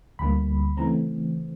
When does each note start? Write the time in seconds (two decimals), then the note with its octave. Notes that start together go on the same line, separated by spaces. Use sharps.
0.19 D2 D3 G3 A#3 B5
0.77 C#3 E3 A3 C4 A#5